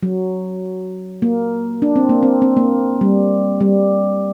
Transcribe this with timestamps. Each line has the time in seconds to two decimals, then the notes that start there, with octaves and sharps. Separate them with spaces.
0.03 F#3
1.22 A#3
1.82 D4
1.96 C4
2.09 A#3
2.23 C4
2.42 C4
2.57 A#3
3.01 G3
3.61 G3